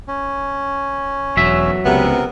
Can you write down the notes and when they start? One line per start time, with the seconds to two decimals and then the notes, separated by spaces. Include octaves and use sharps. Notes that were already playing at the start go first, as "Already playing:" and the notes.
0.08 C#4
1.37 E1 F#3 E5
1.86 C#2 C3 B3 A#4